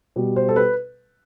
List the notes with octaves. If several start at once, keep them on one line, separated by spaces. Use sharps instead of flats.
B2 G3
C5
A4
B4